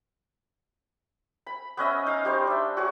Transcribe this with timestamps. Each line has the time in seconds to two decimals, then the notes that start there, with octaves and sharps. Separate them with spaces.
1.47 B5
1.77 B3 C#4 D#5 E5
2.06 D#4 F5
2.25 G3 C5 C#6
2.47 D4 E5
2.77 F#4 G#4 C#5